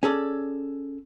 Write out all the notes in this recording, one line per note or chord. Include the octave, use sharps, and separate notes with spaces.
C#4 G#4 A4 D5